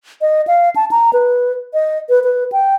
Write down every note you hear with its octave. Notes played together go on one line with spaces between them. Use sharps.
D#5
F5
A5
A#5
B4
D#5
B4
B4
G5